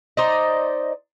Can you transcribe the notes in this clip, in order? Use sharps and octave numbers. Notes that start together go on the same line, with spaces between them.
D#4 C5 D5 D#5